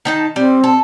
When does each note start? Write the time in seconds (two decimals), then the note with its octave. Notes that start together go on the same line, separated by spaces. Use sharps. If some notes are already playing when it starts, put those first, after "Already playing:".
0.05 D#3 D#4 A5
0.36 G3 C4
0.64 A4